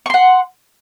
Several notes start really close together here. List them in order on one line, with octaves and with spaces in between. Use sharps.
C#6 C6 F#5